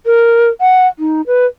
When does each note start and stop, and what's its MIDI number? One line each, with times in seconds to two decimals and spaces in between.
0.06 0.49 70
0.61 0.87 78
0.99 1.22 63
1.27 1.46 71